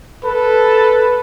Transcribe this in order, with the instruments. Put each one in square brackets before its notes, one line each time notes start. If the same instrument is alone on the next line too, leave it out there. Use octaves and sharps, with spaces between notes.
[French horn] A4 [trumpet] B4